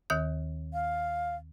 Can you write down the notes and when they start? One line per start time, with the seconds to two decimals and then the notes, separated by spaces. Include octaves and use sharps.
0.10 D#2 D#3 G6
0.73 F5